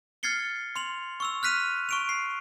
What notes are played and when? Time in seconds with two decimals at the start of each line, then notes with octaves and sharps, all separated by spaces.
0.23 F6 G#6 A6 C7 C#7 G7
0.76 C6 F7 F#7
1.20 C#6 E6 F7
1.43 F6 F#6 B6 D#7 F7
1.89 C#6 D7 F7
2.09 C7